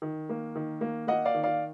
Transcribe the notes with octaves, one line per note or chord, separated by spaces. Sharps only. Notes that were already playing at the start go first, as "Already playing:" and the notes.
D#3
A#3
D#3
A#3
A#3 D#5 F#5
D5 F5
D#3
D5 F5